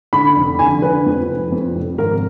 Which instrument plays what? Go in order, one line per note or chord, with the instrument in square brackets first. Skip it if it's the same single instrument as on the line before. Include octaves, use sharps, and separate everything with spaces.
[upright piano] D3 B5
F1
D3 G#5
D3 B4
F2
F1
F2
F1
G#1 A#4